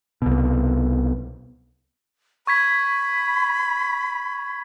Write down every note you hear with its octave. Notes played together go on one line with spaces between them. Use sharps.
C2 B2
B5 C#6 G#6 B6